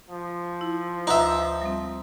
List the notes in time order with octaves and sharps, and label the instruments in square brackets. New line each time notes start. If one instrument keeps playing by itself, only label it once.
[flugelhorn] F3
[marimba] E4
[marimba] D2 F4 B4 [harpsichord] D#4 E5
[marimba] G3 C4